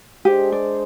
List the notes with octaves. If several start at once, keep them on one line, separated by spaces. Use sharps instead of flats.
G#3 D4 G4 G#4 C5 D#5
D5